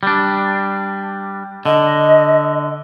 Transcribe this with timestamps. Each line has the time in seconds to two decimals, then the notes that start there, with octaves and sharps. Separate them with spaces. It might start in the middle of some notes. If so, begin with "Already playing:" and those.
0.03 G3 D4
1.66 D3 D#5